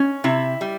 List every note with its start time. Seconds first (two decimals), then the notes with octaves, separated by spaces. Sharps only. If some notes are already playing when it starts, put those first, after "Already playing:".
Already playing: C#4
0.24 C3 E4
0.61 G3